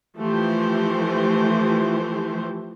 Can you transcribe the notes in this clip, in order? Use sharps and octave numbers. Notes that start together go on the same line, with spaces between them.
E3 F3 A3 G4 C5